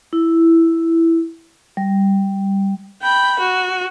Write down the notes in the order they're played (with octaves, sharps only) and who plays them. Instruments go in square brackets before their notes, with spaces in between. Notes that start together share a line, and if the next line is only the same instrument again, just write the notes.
[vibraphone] E4
G3
[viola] G5 B5
F#4